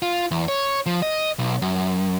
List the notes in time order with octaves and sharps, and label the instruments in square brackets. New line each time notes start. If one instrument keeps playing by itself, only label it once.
[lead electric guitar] F4
E2
C#5
F3
D#5
B1
F#2